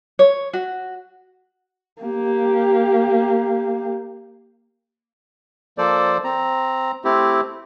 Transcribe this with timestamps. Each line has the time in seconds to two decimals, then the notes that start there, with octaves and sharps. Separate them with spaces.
0.19 C#5
0.53 F#4
2.02 A#3 G4
5.78 F3 A#3 A4 C5 D5
6.24 C4 A#5
7.04 A3 C4 E4 G4